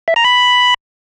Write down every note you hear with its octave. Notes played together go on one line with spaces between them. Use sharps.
E5
A#5
B5